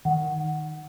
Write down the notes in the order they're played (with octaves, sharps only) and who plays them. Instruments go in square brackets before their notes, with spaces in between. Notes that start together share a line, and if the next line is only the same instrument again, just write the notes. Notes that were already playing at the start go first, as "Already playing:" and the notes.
[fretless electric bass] D#3 [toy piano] F#5